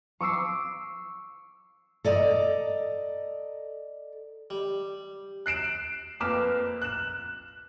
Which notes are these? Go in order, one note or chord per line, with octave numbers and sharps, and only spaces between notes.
C#6 D6 E6 C7
A4 D5 D#5 A#5
G3
F#6 C7 D7 E7
F2 A#3 B4 D6 F6 E7
F#6 E7